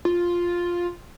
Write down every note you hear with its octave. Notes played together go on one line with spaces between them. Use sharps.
F4